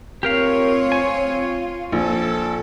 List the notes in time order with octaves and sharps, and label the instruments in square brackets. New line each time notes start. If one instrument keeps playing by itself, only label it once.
[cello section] C4 F4 C#5 [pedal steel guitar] G4 A#4 F5
[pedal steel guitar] G#5
[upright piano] A#1 [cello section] A4